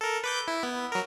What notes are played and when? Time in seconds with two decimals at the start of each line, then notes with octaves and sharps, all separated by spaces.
0.01 A4 A#4
0.24 B4 D6 G6
0.48 E4
0.63 B3
0.92 F#3 A#4